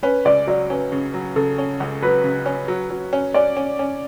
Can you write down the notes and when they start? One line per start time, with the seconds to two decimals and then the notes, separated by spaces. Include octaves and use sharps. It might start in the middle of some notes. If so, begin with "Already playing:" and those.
0.03 C#4 B4
0.25 C#2 D5
0.47 F#3 D5
0.70 C#4 B4
0.92 C#3
1.14 F#3
1.36 C#3 A4
1.58 C#4
1.80 C#2
2.03 F#3 B4
2.24 C#3
2.46 C#4
2.68 F#3
2.90 F#3
3.13 C#4
3.34 C#4 D5
3.57 C#4
3.79 C#4